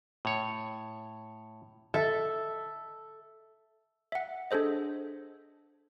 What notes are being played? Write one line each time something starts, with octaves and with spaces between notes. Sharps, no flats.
A2 C#5
A4 E5
E5 F#5
D4 G#4 A4 C5 D#5